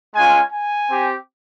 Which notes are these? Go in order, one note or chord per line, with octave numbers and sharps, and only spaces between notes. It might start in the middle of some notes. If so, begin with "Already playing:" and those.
G#3 C#4 F4 G#5
G#5
C4 G4